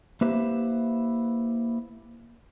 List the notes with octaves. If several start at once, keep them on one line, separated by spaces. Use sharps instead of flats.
A#3 E4 G4 B4 C5 E5